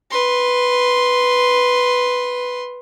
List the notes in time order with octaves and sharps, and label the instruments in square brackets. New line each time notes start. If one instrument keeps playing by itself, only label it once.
[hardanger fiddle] B4 C6